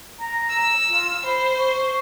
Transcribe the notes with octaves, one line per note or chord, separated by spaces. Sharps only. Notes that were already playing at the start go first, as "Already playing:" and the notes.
A#5
E6
F4
C5 B5
C#6